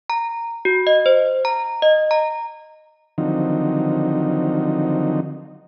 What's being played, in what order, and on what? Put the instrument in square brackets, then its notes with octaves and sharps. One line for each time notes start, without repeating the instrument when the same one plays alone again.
[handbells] A#5
F#4
D#5
C5
A#5
D#5
A#5
[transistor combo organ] D3 D#3 F3 F#3 C4 D#4